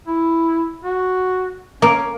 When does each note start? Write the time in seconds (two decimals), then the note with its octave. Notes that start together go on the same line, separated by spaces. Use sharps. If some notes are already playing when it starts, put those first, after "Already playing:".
0.07 E4
0.84 F#4
1.82 A#3 C#4